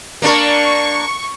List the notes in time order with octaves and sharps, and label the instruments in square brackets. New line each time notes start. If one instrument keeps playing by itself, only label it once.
[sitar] A#3 D4 A#4 [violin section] C#6